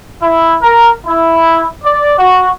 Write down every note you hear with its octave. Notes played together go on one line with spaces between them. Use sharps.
E4
A#4
E4
D5
F#4